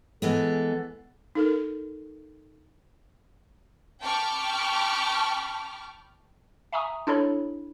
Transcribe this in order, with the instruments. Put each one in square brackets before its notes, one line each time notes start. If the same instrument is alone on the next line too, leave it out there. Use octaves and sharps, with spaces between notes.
[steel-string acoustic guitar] E3 G#3 B3 [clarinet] A4
[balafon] D#4 A4 A#4
[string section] G5 A5 B5 C#6 D6 F6
[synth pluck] E5 G#5 A#5 C#6 D#6
D4 E4 A4 C#5 B5